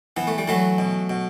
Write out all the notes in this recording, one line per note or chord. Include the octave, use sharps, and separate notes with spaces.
E3 B3
A3
G3
E3 F#3 A3
B2
B2